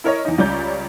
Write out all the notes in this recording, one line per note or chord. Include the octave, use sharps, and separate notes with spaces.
E4 A#4 C#5 D#5
E2 D#4
C#2 G3 C#4 D5 A#5 G6